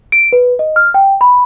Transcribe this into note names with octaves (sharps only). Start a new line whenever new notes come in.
D7
B4
D#5
F6
G5
B5